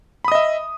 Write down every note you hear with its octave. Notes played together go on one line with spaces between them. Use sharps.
D#5 E5 B5 D#6